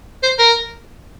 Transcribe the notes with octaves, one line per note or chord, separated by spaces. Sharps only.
C5
A#4